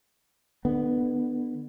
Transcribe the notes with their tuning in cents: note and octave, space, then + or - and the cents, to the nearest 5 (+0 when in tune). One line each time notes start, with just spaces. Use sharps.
D3 +30 B3 +0